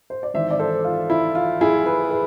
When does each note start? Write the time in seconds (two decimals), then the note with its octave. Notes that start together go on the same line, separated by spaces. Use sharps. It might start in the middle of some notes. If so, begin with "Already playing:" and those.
0.10 C5
0.23 D5
0.34 G#1 G#2 E3 C5 E5
0.50 D5
0.59 A4 C5
0.84 F4
1.10 E4
1.35 F4
1.61 E4 G#4
1.86 G#4 B4
2.11 G#4 B4